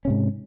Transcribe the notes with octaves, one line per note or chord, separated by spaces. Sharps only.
G#2 C3 C#4